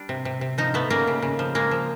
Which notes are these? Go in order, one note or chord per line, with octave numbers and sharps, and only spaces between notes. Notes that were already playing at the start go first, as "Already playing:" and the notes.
Already playing: G3 D4
C3
C3
C3
F3 D#4
A3 B3
C#3 A#3
C#3
C#3
F3
G#3 A#3
F3